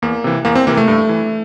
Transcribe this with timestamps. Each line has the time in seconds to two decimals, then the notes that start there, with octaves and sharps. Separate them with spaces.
0.02 E2 A#3
0.24 C3 E3
0.45 E2 A#3
0.55 C4
0.67 C3 E3 A#3
0.77 A3
0.88 G2
1.09 E3